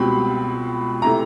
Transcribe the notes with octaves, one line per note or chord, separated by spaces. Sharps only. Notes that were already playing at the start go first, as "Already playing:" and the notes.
Already playing: C#2 B2 G3 C4 B5
C3 E3 A3 A#5